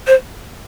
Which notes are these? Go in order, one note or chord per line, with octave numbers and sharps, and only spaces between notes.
C5